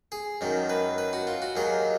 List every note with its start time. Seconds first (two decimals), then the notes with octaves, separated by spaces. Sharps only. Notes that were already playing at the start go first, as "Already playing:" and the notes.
0.12 G#4
0.41 F#2 D#3 F#3
0.70 B4
0.98 B4
1.13 F#4
1.27 F4
1.42 F#4
1.56 D#2 D#3 F#3 G#4